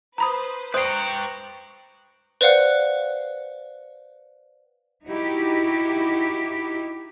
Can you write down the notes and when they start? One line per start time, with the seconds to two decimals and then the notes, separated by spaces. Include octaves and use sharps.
0.18 B4 C5 A#5 B5 D#6
0.74 B4 C5 G5 A#5 C#6 D#6 F#6 C7
2.41 B4 C5 D5 F5 F#5 F#6
5.06 D#4 E4 F#4 G4